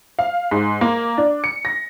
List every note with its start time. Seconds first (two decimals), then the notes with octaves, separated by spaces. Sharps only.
0.19 F5
0.51 G#2
0.81 A#3
1.18 D4
1.44 C#7
1.65 A#6